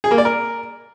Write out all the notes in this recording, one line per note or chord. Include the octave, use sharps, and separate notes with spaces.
G#4
A#3
D5
A#4